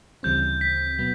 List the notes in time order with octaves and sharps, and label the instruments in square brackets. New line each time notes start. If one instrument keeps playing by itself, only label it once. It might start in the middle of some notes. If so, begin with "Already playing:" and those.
[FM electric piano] D2 C#3 E3 G3 C4 [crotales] G6
[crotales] B6
[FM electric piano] B2 F#3 B3